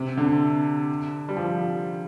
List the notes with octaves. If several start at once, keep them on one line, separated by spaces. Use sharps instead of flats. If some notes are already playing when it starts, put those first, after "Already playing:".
Already playing: C3
D3
G3
F3